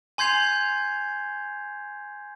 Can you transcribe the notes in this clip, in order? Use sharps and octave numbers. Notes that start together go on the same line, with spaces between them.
G#5 C6 G6 G#6 C7 F7